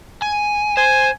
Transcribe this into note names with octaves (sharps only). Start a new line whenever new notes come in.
G#5
C5 G#5